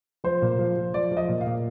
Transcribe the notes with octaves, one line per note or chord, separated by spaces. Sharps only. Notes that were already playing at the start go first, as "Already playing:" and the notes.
F3 C5
A#2
F3
F3
F3 D5
F3
D#5
A#2
F5
A#2